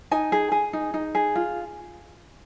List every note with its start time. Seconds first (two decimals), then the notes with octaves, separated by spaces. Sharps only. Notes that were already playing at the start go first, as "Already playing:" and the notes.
0.11 D#4 G#5
0.32 G#4
0.52 G#4
0.73 D#4
0.94 D#4
1.15 G#4
1.35 F4